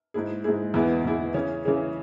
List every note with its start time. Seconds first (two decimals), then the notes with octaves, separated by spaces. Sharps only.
0.14 G#2 G#3 E4 G#4
0.44 G#2 G#3 E4 G#4
0.74 E2 E3 B3 E4 G#4
1.04 E2 E3 B3 E4 G#4
1.34 C#3 E3 C#4 G#4
1.65 C#3 E3 C#4 G#4